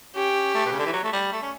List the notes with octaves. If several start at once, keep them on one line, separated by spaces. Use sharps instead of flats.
C#4 G4
A3
B2
C#3
D3
E3
F#3
A3
G3
A3
C#4